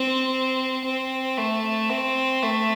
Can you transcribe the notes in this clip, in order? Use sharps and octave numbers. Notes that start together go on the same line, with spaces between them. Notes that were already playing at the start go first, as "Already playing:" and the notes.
Already playing: C4
C4
A3
C4
A3